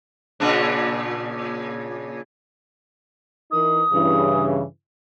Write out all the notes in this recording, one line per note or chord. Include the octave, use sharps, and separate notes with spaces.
A#2 C#3 D4
E3 D#4 A#4 D#6
G2 C#3 E3